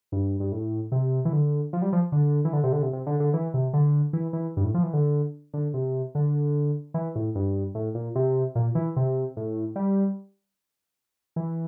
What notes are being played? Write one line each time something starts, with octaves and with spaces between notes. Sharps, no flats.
G2
G2
A2
C3
E3
D3
F3
G3
F3
D3
E3
D3
C3
D3
C3
C3
D3
D3
E3
C3
D3
E3
E3
G2
A2
F3
E3
D3
D3
C3
D3
E3
A2
G2
A2
A#2
C3
A#2
E3
C3
A2
G3
E3